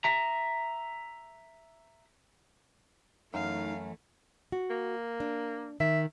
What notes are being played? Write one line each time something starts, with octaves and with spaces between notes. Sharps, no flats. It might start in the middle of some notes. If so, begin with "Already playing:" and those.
E5 A#5
F#2 E3 A3 D#4 F5
F#4
A#3
D4
D#3 E5